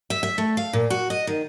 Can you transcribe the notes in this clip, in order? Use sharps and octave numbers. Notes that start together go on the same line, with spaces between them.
E5
E5
A3
F5
A#2
F#4
D#5
D#3